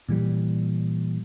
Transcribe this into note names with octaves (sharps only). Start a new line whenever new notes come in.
A#2 E3 G3